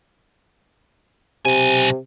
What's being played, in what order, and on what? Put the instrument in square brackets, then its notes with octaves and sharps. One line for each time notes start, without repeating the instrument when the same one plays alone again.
[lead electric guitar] B1 G#5 [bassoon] C3